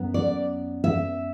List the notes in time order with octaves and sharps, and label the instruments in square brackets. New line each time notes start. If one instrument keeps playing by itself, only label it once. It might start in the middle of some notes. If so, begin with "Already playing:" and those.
Already playing: [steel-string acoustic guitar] F#2 B3
D5
E5